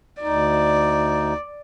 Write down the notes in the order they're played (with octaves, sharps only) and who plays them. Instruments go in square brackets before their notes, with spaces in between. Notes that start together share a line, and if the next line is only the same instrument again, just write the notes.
[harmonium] D2 D#4 [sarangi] D5